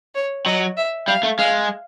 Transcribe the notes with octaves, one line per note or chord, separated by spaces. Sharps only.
C#5
F#3 D#5
E5
G3 F5
A3
G#3 F5